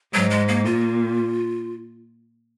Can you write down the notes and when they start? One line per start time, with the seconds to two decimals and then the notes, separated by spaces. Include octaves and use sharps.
0.14 G#2 F#3
0.31 G#3
0.48 A#3
0.66 A#2 F4